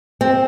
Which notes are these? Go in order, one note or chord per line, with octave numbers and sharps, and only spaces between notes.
C4